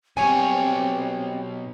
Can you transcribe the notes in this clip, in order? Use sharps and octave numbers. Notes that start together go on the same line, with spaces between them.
B1 G3 C4 C#5 G#5